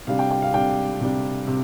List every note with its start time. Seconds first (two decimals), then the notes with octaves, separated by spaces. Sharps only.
0.07 C3 G3 D4 F5
0.19 G5
0.31 G5
0.42 F5
0.54 C3 G3 D4 G5
1.00 C3 G3 D4
1.47 C3